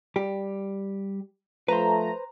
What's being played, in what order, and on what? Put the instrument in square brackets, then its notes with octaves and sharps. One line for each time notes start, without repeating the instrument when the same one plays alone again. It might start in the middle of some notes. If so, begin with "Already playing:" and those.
[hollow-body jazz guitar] G3 G4
[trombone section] F3 A3 [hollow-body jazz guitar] B4 C5 [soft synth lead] A#5